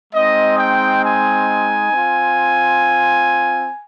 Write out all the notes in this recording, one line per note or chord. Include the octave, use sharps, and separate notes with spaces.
G#3 C4 D#4 D#5
G5
G#5
C4 F4